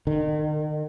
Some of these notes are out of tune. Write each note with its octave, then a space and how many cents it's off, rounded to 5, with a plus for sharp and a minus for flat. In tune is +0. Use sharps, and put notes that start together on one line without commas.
D#3 -35